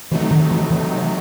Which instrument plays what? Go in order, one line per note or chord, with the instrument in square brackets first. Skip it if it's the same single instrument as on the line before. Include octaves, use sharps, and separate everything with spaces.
[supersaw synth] C3 F#3 A3 D#4 [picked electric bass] E3
[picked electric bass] D#3
E3
E3